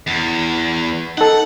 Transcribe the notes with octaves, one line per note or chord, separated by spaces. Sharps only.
E2
D#4 A4 F#5